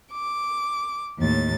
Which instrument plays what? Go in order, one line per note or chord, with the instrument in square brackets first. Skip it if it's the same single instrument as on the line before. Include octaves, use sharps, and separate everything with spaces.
[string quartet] D6
D#2 A2 A6